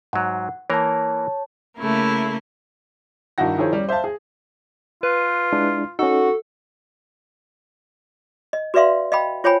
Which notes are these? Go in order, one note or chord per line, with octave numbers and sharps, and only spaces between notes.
G#2 F#3 F#5
E3 A#3 A#4 C#5 A5
C#3 A3 A#3 E4
G2 D#3 D#4 E4 F#4 A#6
D#3 F3 E4 G#4 C5 C#5
G3 C#4
C5 E5 F5 A5
G#4
F4 B4
G#3 D4 E4
C#4 D#4 F#4 A4
D#5
F#4 B4 D5 E5 F5 C6
D#5 F5 G5 B5
F4 C5 C#5 G5 G#5 B5